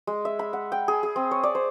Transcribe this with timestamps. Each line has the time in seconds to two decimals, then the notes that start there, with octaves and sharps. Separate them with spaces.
0.07 G#3
0.25 E5
0.39 B5
0.53 F#5
0.72 G5
0.88 G#4
1.03 G#4
1.16 C4
1.31 C#5
1.43 D5
1.55 C5